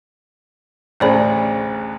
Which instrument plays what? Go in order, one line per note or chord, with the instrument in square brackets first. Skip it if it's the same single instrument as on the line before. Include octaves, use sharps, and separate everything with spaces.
[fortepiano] A1 D2 C#3 [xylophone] C5 D5 B5